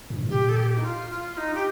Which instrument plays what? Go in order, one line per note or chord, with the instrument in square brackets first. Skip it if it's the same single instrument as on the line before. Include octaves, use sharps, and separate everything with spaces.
[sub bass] G2
A2
[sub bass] A#2 [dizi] G4
[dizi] A4
G4
D#4
F4
F4
D#4
G4